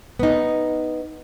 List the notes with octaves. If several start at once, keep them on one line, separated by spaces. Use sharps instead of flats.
B3 D#4